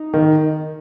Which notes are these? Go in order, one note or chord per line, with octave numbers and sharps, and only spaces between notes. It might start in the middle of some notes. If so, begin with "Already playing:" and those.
Already playing: D#4
D#3